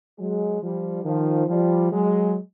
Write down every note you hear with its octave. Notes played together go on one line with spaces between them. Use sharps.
F#3 G#3
F3 G3
D#3 F3
F3 G3
F#3 G#3